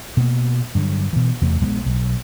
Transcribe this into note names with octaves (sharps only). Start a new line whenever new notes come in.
B2 A#3
G2 D3 F#3
B2 E3
E2 C3 A3
A#1 G#3 B3
B1